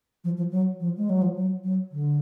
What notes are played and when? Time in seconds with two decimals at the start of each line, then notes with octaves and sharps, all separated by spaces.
0.24 F3
0.37 F3
0.51 F#3
0.80 F3
0.97 G#3
1.09 F#3
1.22 F3
1.36 F#3
1.64 F#3
1.92 D3